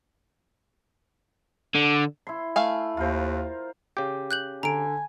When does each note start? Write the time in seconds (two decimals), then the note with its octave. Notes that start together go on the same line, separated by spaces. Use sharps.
1.75 D3
2.27 E4 C6
2.56 A3 F5 G#5
2.97 D#2 F4 A#4 C5
3.97 C#3 G4
4.31 F#6 G6 F#7
4.63 D3 G#5 A#5 D7